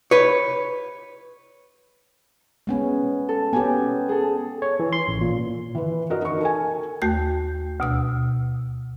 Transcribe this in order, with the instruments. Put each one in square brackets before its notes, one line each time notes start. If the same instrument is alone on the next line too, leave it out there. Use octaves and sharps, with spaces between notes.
[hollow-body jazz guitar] B4 C#5
[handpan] G#3 B3 C#4
[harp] A4
[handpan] B3 C#4 G4 [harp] G#5
[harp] G#4 A4
[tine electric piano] C#5
E3
C6
A1
A#2
[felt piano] E3 B4
F#4 A#4 D#5
D#4 C#6
A4 A#4 G#5
[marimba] D#2 A3 F#4 G6
D2 B2 E6